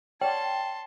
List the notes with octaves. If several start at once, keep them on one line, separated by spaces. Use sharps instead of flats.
C#5 D5 F#5 G5 A5 C6